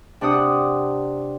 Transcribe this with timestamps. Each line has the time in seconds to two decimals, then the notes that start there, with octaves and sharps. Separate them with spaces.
0.21 C3 D4 G4 F#5 D#6